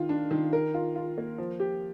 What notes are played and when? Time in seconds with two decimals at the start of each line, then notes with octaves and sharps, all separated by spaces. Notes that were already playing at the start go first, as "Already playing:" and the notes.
Already playing: D#3 F4
0.09 D4
0.31 D#3
0.53 A#4
0.74 F4
0.96 F4
1.18 A#3
1.38 F3
1.60 G4